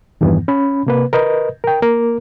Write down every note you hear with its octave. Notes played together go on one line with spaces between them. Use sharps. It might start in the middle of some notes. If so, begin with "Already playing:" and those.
E2 G2 D#3 E3 B3
C#4 B5
C3 A#3 B4
A#4 B4 D#5
A#4 G5
A#3 A#4